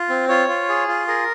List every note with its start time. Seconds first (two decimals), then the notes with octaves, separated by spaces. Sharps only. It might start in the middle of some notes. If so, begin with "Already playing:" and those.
Already playing: F4
0.09 C4
0.29 F4 C#5
0.48 F4
0.69 G#4
0.88 F4
1.07 G#4 A#4